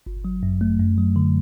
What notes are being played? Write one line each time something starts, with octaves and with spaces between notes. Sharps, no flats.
G1
F#3
F#2
A3
F#2
F#3
D3